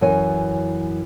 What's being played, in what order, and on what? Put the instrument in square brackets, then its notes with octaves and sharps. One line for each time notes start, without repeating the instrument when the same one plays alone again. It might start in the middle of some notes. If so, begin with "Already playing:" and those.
[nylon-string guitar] F#2 E3 C#5 G#5